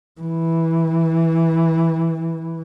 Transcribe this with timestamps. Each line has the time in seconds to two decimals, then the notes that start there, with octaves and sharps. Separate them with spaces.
0.21 E3